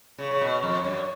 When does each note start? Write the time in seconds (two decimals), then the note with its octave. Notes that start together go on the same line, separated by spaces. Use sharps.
0.18 C#3
0.31 C#3
0.41 B2
0.63 F2
0.84 F#2